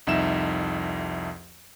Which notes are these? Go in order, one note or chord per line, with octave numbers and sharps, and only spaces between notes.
C2 F2 D#4 E5 E7